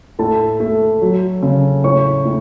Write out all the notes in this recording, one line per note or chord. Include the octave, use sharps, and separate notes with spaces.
A2 A4 A5
A3
F#3
C#3
A2 C#5 C#6
A2